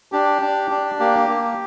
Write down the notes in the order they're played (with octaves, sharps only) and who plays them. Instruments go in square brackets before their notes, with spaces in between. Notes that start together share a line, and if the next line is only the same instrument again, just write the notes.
[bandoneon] D4 G4
D4
D4
A#3 G4
A#3